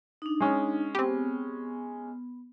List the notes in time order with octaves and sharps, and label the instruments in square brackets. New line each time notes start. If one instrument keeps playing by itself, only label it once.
[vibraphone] D4 D#4
[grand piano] G#3 C#4
[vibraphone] B3 [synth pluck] C4 G4